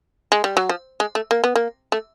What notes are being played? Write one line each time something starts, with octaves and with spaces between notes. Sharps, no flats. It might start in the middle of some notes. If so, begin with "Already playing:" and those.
G#3
G3
F#3
F3
G#3
A3
A#3
B3
A#3
A3